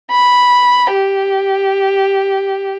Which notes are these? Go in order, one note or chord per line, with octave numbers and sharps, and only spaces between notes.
B5
G4